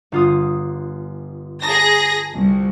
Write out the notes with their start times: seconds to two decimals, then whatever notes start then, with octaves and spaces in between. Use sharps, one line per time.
0.12 G1 F4 D#6
1.62 G#4 A5 A#5 D#6 A#6
2.34 C2